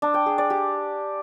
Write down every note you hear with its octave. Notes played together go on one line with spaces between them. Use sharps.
D4
G5
G#4
D5
G4